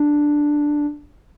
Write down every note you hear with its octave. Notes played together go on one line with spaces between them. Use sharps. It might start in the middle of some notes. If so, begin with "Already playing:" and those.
Already playing: D4